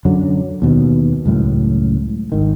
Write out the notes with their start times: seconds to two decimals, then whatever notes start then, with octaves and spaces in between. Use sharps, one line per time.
0.05 F#2 D3 F#3
0.62 D#2 B2
1.26 C#2 F#2 A2
2.32 G#1 D#3